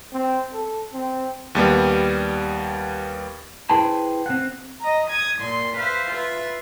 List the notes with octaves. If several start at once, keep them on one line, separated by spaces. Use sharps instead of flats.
C4
A4
C4
D#2 G3 B3
E4 G#4 B4 C5 G5 A5
C4 F#5
D#5 A#5
D#6 G#6
A#2 C6
B4 C5 E5 F5
F4 B4 E5